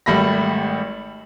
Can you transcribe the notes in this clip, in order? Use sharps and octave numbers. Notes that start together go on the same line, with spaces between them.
G#1 G3 A3 B5 A#6